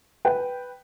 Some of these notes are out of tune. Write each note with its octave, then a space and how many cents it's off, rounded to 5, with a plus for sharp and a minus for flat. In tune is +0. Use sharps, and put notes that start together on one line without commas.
B4 +0 G5 +0